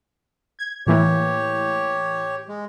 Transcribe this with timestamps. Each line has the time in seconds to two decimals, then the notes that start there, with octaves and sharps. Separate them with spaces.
0.59 G#6
0.87 A2 E3 A#3 G4 C#5
2.48 G#3